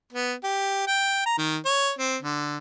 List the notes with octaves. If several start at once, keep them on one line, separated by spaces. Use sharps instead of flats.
B3
G4
G5
A#5
D#3
C#5
C4
D3